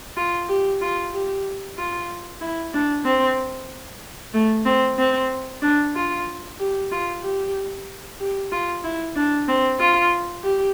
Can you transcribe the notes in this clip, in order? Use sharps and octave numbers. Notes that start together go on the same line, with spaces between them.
F4
G4
F4
G4
F4
E4
D4
C4
A3
C4
C4
D4
F4
G4
F4
G4
G4
F4
E4
D4
C4
F4
G4